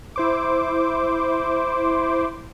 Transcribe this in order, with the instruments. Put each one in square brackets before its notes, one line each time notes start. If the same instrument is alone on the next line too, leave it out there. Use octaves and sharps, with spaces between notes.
[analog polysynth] E4 C5 D6